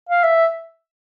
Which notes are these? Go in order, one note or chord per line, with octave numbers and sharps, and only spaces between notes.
F5
E5